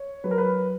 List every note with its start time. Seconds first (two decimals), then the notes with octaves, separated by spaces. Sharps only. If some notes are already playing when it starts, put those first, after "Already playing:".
Already playing: C#5
0.24 F#3 B4
0.31 A#4
0.38 B4